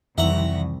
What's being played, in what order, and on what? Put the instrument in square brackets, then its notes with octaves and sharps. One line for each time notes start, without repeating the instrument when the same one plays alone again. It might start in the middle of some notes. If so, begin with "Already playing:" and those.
[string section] C2 [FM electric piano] F2 [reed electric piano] D#3 E3 [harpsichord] E5 F#5 A#5